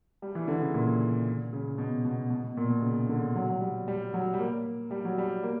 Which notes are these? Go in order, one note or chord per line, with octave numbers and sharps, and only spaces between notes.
G3
E3
D3
C#3
A#2
C#3
B2
B2
B2
B2
A#2
B2
C#3
D3
F#3
F#3
G3
G3
F#3
G3
A#3
G3
F#3
G3
A#3